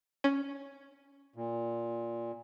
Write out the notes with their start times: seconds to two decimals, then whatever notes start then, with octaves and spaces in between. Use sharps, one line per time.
0.24 C#4
1.36 A#2